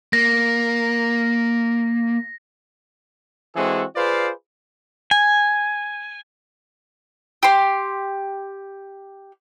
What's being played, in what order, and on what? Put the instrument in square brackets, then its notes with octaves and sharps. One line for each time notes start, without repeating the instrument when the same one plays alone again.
[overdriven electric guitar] A#3 [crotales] A#6
[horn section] E3 G#3 C4 F#4 G#4 A4
F4 G#4 B4 C5 D5 F5
[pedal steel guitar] G#5
[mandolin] G4 C6